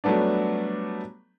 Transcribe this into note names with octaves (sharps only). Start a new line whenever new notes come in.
F#3 G3 A3 B3 D4